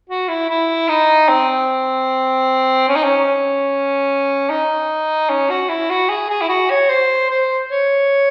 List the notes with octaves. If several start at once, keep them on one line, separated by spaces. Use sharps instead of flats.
F#4
E4
E4
D#4
C4
C#4
D#4
C#4
D#4
C#4
F#4
E4
F#4
G#4
G#4
E4
F#4
C#5
C5
C5
C#5